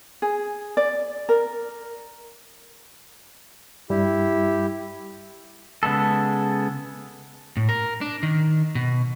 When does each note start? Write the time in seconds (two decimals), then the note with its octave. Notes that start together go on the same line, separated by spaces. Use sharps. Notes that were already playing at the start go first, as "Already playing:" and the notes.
0.22 G#4
0.77 D5
1.29 A#4
3.90 G2 G3 E4 G4
5.83 C#3 G#3 B3 A4
7.57 A2
7.69 A#4
8.01 D4
8.23 D#3
8.75 B2